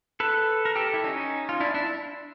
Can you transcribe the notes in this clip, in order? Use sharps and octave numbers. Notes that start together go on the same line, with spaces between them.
A4 B4
A#4
G4 A4
E4
C#4 D#4
F4
D4 E4
D4 E4